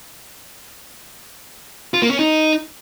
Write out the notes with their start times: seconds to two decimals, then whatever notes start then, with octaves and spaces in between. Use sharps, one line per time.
1.94 F4
2.02 A#3
2.11 C#4
2.19 D#4